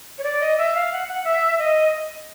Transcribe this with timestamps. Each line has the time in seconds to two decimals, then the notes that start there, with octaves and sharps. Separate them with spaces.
0.18 C#5
0.24 D5
0.41 D#5
0.58 E5
0.75 F5
0.92 F#5
1.08 F#5
1.24 E5
1.59 D#5